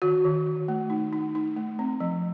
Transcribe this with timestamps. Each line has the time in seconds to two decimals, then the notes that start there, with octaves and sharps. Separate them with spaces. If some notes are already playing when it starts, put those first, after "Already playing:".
0.02 D#3 F#4
0.25 D#3
0.47 D#3
0.68 A3
0.90 D#4
1.13 D#4
1.35 D#4
1.56 A3
1.79 C4
2.00 F3